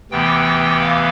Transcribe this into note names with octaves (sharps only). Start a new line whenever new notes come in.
D2 C3 E3 B3 G5
F5